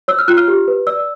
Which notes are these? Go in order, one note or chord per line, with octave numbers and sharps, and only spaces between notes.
C#5 E6
F6
F4 F#6
F6
G4
B4
D5 E6